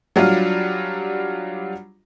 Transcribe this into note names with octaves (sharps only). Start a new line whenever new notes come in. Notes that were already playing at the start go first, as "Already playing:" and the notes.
F#3 G3 D4 F4